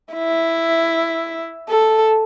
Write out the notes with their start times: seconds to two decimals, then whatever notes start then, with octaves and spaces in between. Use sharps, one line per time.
0.14 E4
1.69 A4